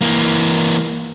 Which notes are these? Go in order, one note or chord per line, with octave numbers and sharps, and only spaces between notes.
E3 A#3